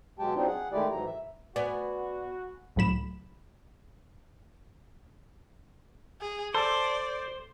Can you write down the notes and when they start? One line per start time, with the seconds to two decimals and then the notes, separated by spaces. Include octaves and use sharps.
0.19 B2 F#3 G#3 G4 G5 A5
0.35 F#3 C4 D4 D#4 F4
0.47 G#4 F#5
0.73 D#3 G#3 A3 E4 G4 D5
0.91 G#2 E3 F#3 A#5
1.06 E5
1.56 B3 F#4 D5 G#5
2.76 C#2 A2 F#3 B5 E7
6.21 G#4
6.54 A4 C5 D5